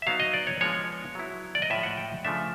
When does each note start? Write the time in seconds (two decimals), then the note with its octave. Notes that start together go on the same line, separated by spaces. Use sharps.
0.02 E5
0.07 F#3 B3 D#4 F5
0.20 D#5
0.34 D5
0.47 C#5
0.61 F3 G#3 B3 D4 C#5
1.15 F#3 B3 E4
1.55 D5
1.62 D#5
1.70 A2 F3 G#3 E5
1.83 F#5
1.97 G5
2.25 C#3 F3 A3 D4 E5